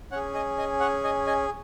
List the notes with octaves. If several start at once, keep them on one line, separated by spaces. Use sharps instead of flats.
C#4 G#4 C#5 F#5
D#5 G#5
D#5 G#5
C#5 F#5
D#5 G#5
D#5 G#5